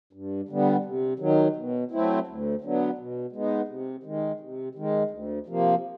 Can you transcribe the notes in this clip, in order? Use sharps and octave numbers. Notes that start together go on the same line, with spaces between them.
G2
D3 G3 B3
C3
D#3 F#3
B2
F#3 A3 C4 E4
D2
D3 F#3 B3
B2
G#3 B3 D#4
C3
D#3 G#3
C3
D#3 G#3
D2
C3 F3 A#3